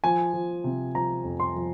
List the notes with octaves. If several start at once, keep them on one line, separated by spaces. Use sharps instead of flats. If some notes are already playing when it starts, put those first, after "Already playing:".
F3 G#5
F3
C3
F3 A#5
F2
C6
F3